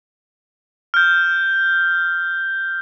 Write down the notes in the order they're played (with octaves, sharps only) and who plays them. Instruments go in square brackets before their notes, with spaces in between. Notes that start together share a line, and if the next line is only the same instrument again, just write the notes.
[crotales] F6 G6